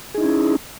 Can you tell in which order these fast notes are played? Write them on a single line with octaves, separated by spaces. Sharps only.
G#4 D#4 E4 C#4